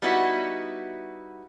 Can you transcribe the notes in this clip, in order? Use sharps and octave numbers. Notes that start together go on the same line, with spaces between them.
G3 B3 D#4 E4 F#4